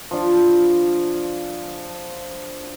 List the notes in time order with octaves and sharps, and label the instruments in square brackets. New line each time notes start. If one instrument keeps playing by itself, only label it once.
[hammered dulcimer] F3 D4 F4